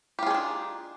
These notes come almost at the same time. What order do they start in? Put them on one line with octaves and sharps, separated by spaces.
G4 F4 G#4 D#4 D4